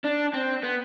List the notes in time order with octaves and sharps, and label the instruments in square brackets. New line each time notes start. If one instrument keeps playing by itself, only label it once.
[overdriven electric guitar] D4
C4
B3